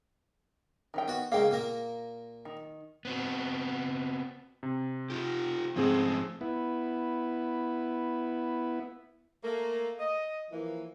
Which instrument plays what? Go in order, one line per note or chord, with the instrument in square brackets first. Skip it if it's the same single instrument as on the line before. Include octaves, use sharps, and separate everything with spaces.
[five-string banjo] D#3 C#4 G5
[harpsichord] B3 F#4
[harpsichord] C#3 G#3 A#3 [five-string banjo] F5 G5
[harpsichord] A#2 A#3 A#4
[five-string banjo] D#3
[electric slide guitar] B3 C4 F#4
[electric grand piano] C3
[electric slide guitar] F4 G4
[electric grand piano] G#2 C4 G#4 [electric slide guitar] F3 A3 C#4
[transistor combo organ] B3 E4
[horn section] A3 A#3
D#5
E3 F3 A#3